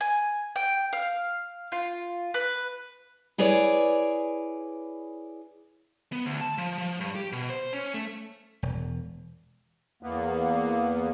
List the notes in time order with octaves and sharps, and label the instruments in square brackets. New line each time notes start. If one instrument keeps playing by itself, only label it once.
[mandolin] G#5
G5
F5
F4
B4
[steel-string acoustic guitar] E4 G#4 B4 C#5 D5
[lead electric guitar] B3
D2
A5
F3
F3
G2
G4
B2
C5
C#4
A3
[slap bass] E1
[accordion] E2 A#3 B3